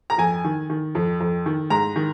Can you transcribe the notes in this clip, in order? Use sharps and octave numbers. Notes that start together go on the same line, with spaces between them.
A#5
F2 G#5
D#3
D#3
F2
F2
D#3
G#2 A#5
D#3